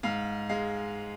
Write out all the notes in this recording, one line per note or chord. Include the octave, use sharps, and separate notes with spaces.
G#2 F5
G#3 F5